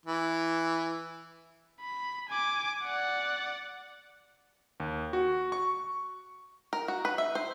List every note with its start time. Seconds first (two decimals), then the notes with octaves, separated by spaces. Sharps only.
0.06 E3
1.81 B5
2.29 G#5 D6
2.84 D5 F#5
4.80 D#2
5.13 F#4
5.52 C#6
6.73 A#4
6.88 F#4
7.05 B4
7.18 E5
7.35 C5